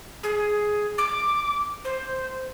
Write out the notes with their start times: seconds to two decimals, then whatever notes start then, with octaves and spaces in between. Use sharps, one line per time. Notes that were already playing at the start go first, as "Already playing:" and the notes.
0.23 G#4
0.98 D6
1.85 C5